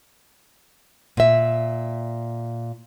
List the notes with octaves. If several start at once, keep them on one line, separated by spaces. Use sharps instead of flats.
A#2 E5